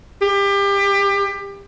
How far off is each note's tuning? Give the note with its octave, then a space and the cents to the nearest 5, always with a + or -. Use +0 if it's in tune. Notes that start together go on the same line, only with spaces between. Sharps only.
G4 +25